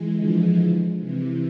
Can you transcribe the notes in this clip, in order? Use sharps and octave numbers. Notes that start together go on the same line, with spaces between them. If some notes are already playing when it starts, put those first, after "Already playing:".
Already playing: E3 G#3
D3 F3
C3 E3